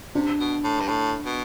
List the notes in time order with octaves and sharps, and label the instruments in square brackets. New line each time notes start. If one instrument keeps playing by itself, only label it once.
[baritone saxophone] C3 [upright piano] D4
[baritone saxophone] B2
A2
G2
A2
B2